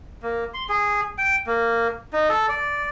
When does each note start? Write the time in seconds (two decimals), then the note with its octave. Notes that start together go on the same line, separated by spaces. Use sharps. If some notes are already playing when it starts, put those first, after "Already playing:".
0.23 A#3
0.54 C6
0.69 G#4
1.18 G5
1.47 A#3
2.13 D#4
2.29 A4
2.49 D5